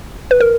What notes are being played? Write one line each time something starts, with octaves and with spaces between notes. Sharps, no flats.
B4
A#4